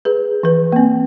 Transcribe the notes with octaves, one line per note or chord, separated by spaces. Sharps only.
G#4 B4
E3 B4
A#3 C4